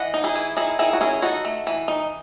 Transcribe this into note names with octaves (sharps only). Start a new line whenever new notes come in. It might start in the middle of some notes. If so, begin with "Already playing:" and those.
Already playing: E3 D#5 F#5
D#4
E4 G#4
E3
D#3 E4 G#4
D#3 E4 G#4
F#4
C#4 E4 G#4
D#4 F#4 A4
A3
E3
D#4